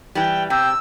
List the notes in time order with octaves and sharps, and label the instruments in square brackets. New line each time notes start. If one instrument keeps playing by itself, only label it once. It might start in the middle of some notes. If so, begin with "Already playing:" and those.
[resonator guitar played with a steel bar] E3 G3 [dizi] G5
[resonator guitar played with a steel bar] C3 [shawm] G5 [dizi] E6